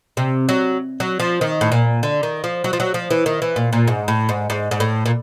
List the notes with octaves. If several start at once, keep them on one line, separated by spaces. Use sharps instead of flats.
C3
F#3
F#3
F3
D#3
A2
A#2
D3
D#3
F3
F#3
F3
F#3
F3
E3
D#3
E3
A#2
A#2
G#2
A2
G#2
G#2
G#2
A2
A#2